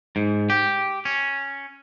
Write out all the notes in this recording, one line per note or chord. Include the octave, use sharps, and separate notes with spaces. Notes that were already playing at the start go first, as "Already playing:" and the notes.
G#2
G4
C#4